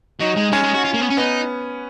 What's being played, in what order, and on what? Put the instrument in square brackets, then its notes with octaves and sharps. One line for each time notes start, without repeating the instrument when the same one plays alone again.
[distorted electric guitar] F#3 [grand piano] D#4
[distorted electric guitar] G#3
[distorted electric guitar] G#3 [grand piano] C#4
[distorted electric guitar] G#3
F#4
F4
A#3
B3
C#4
[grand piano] B3 [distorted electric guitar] D#4